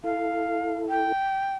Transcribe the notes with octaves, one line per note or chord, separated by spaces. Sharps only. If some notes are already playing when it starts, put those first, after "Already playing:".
E4 A4 F5
G5